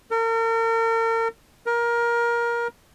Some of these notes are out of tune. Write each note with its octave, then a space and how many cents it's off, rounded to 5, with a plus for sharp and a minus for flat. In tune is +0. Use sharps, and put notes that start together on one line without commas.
A#4 -40
A#4 +20